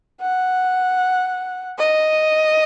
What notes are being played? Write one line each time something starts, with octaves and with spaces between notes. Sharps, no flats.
F#5
D#5